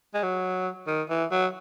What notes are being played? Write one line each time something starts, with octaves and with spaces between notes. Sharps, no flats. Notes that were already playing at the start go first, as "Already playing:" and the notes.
G#3
F#3
D#3
E3
F#3